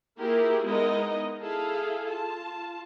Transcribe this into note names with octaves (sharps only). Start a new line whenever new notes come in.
A#3 E4 F4 G4 G#4 A#4
G#3 B3 D#4 E4 A#4 D#5
E4 G#4 A4 F5
F4 A5